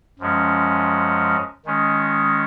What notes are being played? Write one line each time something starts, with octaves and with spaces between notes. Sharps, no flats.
F#2 F3 G#3 C#4
D#3 G#3 C#4